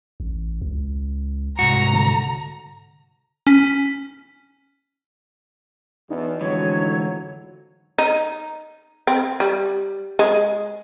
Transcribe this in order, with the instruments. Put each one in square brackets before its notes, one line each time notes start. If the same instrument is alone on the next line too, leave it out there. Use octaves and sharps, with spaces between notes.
[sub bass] A1
C#2
[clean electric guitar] C2 G#2 F#4 [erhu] A#5
[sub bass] D3
[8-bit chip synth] C#4 B6
[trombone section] E2 B2 [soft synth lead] D#4
[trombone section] F2 A2 F#3 [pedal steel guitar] D3 E3 G#3 [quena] C#5
[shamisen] D#4
C4
G3
G#3